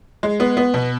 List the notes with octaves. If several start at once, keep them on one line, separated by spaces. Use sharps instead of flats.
G#3
B3
B3
B2